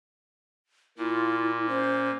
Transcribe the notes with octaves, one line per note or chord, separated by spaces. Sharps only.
A#2 E4 F4
C#4 C5